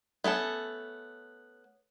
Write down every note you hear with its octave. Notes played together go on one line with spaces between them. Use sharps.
A3 B3 C#4 A4